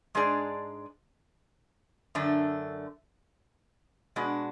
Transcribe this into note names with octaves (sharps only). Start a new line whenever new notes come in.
G#2 G#3 D4 G#4 D5
F#2 D3 A3 D4
B2 G#3 D4 F#4